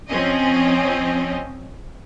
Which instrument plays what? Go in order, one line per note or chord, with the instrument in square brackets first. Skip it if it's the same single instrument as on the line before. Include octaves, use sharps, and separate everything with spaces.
[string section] F3 C4 C#4 D#5